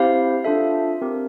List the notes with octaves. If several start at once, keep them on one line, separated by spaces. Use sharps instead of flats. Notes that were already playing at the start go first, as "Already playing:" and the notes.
Already playing: C4 E4 G4 C5 F5
D4 F4 A4 E5
C4 G4 A#4